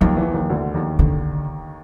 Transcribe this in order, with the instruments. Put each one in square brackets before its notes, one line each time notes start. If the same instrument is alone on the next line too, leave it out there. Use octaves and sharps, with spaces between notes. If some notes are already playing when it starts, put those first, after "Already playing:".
[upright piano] D#2 D#3 [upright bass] F3
[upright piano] E2 E3
D#2 D#3
D2 D3
D#2 D#3
[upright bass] D3